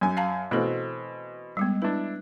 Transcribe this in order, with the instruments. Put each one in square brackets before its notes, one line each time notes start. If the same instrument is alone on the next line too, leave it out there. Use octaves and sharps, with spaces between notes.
[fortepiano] F#2 G#5
[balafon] F5 A5 A#5
[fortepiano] B2 E3 C4 [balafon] A3 A4
[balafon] G3 G#3 B3
[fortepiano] D4 E4 [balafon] B4